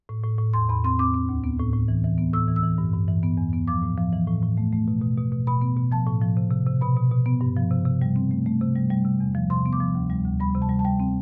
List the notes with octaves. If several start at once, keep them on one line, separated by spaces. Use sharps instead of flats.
A2
A2
A2
E2 C6
E2 B5
C4 C6
C4 D6
C4
D2
B3
A2
A2
E3
E3
B3
A2 E6
E3
E6
E3
G2
G2
E3
B3
E2
B3
F3 D6
A2
F3
E3
A2
A2
A3
A3
B2
B2
B2
B2
B2 B5
B3
B2
F3 A5
A2
F3
C3
C3
C3
B2 B5
B2
B2
B3
G2
F3
C3
C3
G3
C4
A3
A3
C3
G3
G3
C3
E2
F3
C3 C6
B3
D6
F3
D2
G3
D2
G3 B5
C3
A5
G3
A5
G3 G5
C4